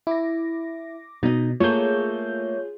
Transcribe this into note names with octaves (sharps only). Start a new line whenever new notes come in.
E4 D6 A#6
B2 D#4 D#5
A3 A#3 F4 G#4 C#5 G6